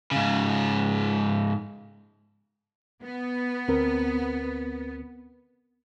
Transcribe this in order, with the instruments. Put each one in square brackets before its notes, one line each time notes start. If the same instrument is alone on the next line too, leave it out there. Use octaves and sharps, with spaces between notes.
[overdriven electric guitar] G#2 C#3
[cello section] B3
[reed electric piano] D2 C4 A#4